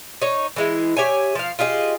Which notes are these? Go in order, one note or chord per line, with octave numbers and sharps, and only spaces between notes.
D#4 C#5
E3 G#3 E4
G4 C#5 E5 G#5
F3 F5
F4 G4 G#4 D#5